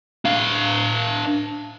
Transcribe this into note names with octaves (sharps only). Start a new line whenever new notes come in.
D4 F5